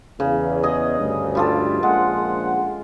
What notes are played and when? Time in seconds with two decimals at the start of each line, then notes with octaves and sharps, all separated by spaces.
0.20 E2 C#3
0.63 G#4 D#5
1.00 D2 G2
1.35 G3 F4 A4
1.83 A#1 G#3 F#5